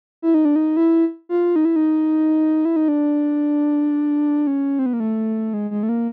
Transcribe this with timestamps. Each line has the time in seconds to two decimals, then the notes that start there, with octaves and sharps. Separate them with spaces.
0.22 E4
0.34 D#4
0.45 D4
0.56 D#4
0.77 E4
1.29 F4
1.56 D#4
1.65 E4
1.76 D#4
2.65 E4
2.76 D#4
2.88 D4
4.47 C#4
4.79 C4
4.86 B3
4.93 A#3
5.00 A3
5.54 G#3
5.71 G#3
5.83 A3
5.89 A#3